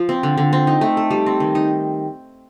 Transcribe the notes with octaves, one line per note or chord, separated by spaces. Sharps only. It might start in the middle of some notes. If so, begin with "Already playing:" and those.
Already playing: F3
C4
D3
D3
C4
D#4
A3
A4
G3
C4
D#3
D#4